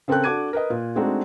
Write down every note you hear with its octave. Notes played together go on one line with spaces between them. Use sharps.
C#3 C4 A4 A#4 G5 F#6
D4 F#4 A4 D6 G#6 D#7
A#4 B4 D#5
A#2
G#3 A3 C4 D4 D#4 F#4